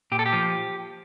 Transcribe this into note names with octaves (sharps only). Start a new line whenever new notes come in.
A#2 G4
A4
G4
F3